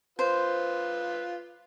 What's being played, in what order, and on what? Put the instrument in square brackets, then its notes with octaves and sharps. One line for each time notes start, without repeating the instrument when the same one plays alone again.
[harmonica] F4 B4 [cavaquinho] C5